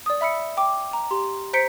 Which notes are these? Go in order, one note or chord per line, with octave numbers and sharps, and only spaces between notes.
D5 D#6
E5 B5 E6 C#7
G5 D6
A#5
G4 C6
C5 A#5 G6 B6 C#7 D7